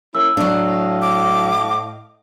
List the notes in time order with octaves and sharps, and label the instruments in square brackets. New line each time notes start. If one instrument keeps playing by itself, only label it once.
[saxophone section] A#3 C#4 E4 [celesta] E6
[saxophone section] A2 D#5 F5 [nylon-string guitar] F#3 D4
[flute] D6